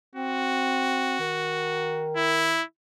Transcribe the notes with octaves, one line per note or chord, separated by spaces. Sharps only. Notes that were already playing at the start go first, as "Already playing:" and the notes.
C4 F#4
D#3
E4